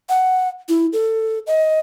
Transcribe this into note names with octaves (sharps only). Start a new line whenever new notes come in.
F#5
E4
A4
D#5